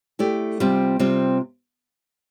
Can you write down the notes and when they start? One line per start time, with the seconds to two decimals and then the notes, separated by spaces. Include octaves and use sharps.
0.19 A3 E4 G4 D5
0.60 C3 G3 C4 F4
0.99 C3 G3 C4 F4